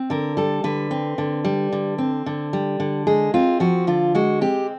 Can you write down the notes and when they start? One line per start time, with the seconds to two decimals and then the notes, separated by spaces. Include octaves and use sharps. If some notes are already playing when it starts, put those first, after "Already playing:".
Already playing: C4
0.10 D3 A#4
0.37 G3 A4
0.64 D3 B4
0.91 C4
1.18 D3
1.44 G3
1.72 D3
1.98 C4
2.26 D3
2.53 G3
2.80 D3
3.07 G#3 G#4
3.34 C4 F4
3.60 F3 F#4
3.87 D3 F4
4.15 G#3 F#4
4.41 C4 G4